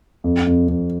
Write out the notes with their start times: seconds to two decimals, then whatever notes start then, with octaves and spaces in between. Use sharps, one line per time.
0.24 F2
0.47 F2
0.68 F2